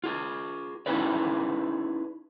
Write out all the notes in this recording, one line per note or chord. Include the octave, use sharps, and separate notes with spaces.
F4 G#4
C#4 D#4 E4 G#4 B4 D5